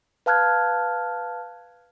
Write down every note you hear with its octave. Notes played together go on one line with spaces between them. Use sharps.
B4 F5 A5 F6 F#6 G#6